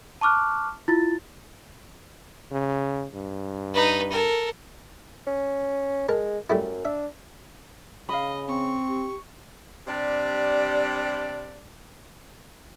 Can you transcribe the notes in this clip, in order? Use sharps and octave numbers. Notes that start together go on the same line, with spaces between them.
A5 C#6 D6 F6 F#6
E4 F4 A6
C#3
G2
D#4 B4
A4 A#4
C#4
G#3 A#4 A5
F#2 G3 A3 E4
D4 E5
C#3 D#5 F5 B5
C4 C#6
G4
C3 G3 D4 D5